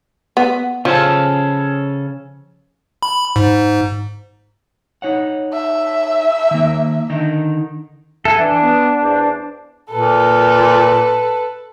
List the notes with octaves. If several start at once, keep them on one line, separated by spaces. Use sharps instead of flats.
B3
C#3 F3 C#4 A4
B5
G#2
D#4 C#5 F#5
E5
D#3 A#3
D3 D#3 D#4
A4 E5 F#5 G#5
E3 D4
B3
E2 C5 D5
A#2 A4 B4